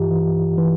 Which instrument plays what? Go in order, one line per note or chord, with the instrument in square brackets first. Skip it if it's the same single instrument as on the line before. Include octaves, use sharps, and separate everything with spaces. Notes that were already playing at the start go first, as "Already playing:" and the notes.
Already playing: [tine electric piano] G2 E3 F4 G4
E3
E3